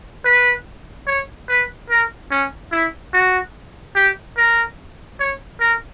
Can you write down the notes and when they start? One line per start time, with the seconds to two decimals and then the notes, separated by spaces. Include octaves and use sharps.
0.25 B4
1.07 C#5
1.49 B4
1.90 A#4
2.31 C#4
2.72 E4
3.13 F#4
3.96 G4
4.37 A#4
5.20 C#5
5.60 A#4